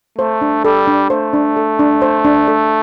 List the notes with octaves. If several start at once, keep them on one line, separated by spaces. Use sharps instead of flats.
A3 C5
D4
G3 A4
D4
A3 C5
D4
A4
D4
C5
D4
A4